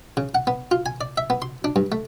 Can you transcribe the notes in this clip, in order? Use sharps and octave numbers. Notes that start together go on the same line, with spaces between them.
C#3
F#5
B3
F4
G#5
D5
E5
B3
C6
D4
G2
A3